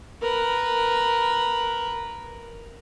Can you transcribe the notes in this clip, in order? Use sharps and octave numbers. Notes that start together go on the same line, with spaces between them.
A#4 B4